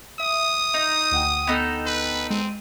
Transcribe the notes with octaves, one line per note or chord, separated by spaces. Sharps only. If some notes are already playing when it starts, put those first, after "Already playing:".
E5 D#6
D#4
D2 F#5 G5
B3 D#4 A4
B4
G#3 C4 D#7